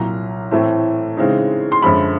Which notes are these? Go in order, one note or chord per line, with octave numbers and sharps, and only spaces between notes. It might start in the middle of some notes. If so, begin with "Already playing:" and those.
Already playing: C2 A#2 F#3 A#5
A2 E3 A3 C4
C#3 E3 G#3 C4 D#4
C6
F#2 D3 F3 G#3 B5